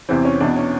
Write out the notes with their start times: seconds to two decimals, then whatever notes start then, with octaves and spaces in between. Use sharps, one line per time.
0.09 E2 C3 E3 C4
0.25 C#4
0.40 E2 B2 D4
0.56 C#4